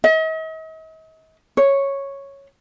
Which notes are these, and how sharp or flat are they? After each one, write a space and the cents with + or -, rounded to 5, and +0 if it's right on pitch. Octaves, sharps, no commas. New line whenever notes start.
D#5 +45
C#5 -5